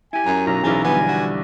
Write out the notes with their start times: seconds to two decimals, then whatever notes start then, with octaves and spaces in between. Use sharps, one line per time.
0.13 E4 G4 G#5
0.26 F#2 A#5
0.47 B1 A#5
0.63 B1 C#3 E3
0.84 D3 F3 G3 B3 G#5
1.08 F#4